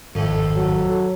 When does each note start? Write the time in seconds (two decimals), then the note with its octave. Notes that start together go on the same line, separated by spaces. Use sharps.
0.15 G#1 F2 A2 A4
0.56 F#3